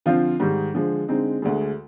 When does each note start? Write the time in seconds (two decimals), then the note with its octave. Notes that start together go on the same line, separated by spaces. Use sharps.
0.06 D3 F3 C4 F4
0.40 G#2 D#3 G3
0.74 D3 F3 G#3
1.08 D3 G#3 C4 D#4
1.42 D2 D3 G#3